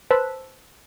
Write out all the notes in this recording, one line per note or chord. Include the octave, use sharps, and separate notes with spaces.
B4 C5 A5 E6 F#6 B6